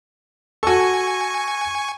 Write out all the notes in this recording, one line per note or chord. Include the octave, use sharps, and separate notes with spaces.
F#4 A4 G#5 C#6